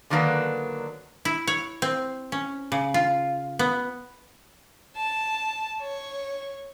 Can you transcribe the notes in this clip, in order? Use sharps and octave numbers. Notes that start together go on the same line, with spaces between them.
D3 D#3 F#3 A#3 B3 D4
E4
C#5
C4
C#4
C#3
F4
B3
A5
C#5